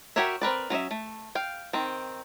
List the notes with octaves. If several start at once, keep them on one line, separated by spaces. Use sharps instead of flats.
F#4 G4 A#4 C#5 E5
C4 A#4 B4 D5
F#3 C#4 D#5 E5
A3
F5 G5
D#3 C4